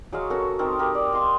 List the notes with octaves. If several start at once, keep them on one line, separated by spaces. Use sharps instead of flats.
F#3 G#3 F#4 F5
C#4 F#4 A4 A#4
C4 D#4 A4 A#4
G4 A#4
D5
D#5 F5 C6 D6